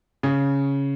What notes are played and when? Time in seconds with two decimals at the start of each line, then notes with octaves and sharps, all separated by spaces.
0.23 C#3